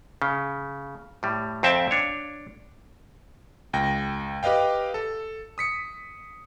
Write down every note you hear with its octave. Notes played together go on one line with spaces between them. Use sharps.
C#3
A2 G3
F2 C4 E5 G5 A5
D4 C#5
C#2 G5 A#6
G4 B4 D#5 F5 G5
A4
D#6 B6 C#7